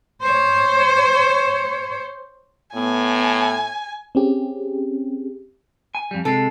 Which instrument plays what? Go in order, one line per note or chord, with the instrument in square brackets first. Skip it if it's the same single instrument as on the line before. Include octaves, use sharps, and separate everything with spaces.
[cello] C5 C#5
[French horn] A2 [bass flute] B3 [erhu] G#5
[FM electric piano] C4 C#4 G4 G#4
[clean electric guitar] G#5
F2 G3
[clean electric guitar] C3 G#3 [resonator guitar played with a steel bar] A4